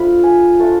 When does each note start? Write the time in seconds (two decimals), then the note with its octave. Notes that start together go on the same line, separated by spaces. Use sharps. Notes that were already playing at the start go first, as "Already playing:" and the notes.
Already playing: F3 A3 D4 F4 B5
0.24 G#5
0.59 A3 D4 F4 A4